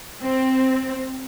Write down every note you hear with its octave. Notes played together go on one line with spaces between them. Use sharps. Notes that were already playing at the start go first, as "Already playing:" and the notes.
C4